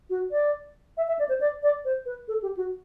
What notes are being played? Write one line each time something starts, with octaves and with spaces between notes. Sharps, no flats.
F#4
D5
E5
E5
D5
C5
D5
D5
C5
B4
A4
G4
F#4